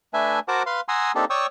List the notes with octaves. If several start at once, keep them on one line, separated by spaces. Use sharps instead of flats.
A3 D4 B4 E5 G#5
F#4 A#4 C5 F#5 A5 D6
B4 F5 C6
F#5 G#5 A#5 C6 D#6 E6
A#3 C4 D4 D#4 G4 A4
C#5 D5 G5 C#6 D#6 E6